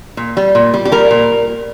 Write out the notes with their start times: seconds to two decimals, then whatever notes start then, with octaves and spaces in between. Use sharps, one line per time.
0.17 A#2
0.37 G3
0.55 A#2
0.74 G3
0.85 G4
0.92 G3 A#4
1.11 A#2